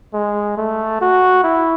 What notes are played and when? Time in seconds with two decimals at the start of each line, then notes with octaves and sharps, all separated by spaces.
0.14 G#3
0.57 A3
1.01 F#4
1.44 E4